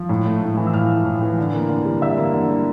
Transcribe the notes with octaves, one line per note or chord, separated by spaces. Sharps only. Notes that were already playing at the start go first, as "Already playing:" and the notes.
Already playing: F3
A2
A3
A2
E3
E6
A2 F5 F6
A3
A2
E3
D3
A#3
D3
G3
D3 E5 E6
A#3
D3
G3